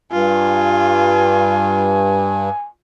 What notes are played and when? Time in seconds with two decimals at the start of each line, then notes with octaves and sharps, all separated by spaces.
0.12 G2 F4 G#5